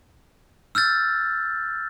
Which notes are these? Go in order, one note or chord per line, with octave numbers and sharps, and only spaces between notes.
E6 F6 G6 A6